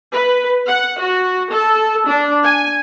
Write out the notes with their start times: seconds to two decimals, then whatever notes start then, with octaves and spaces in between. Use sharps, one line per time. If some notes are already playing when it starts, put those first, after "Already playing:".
0.11 B4
0.67 F#5
1.00 F#4
1.52 A4
2.07 D4
2.43 G#5